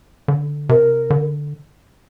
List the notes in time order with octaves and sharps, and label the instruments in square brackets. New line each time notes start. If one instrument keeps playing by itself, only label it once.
[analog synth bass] D3
[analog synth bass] C3 [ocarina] A#4
[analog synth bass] D3